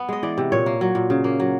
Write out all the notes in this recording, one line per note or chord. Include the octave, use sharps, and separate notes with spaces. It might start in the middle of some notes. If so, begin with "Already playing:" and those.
Already playing: B3
G#3 D#5
E3 D5
C3
A#2 C#5
A#3
F#3
A#2
C#3
A#3
F#3